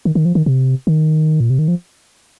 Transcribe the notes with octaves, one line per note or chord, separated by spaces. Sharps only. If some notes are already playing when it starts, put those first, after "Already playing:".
D#3
D#3
F3
D#3
C3
D#3
A#2
C3
D#3
F3